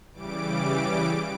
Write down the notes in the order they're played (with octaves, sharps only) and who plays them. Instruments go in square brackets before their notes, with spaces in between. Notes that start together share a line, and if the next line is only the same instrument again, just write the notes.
[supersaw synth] C#3 E3 G3 D6 D7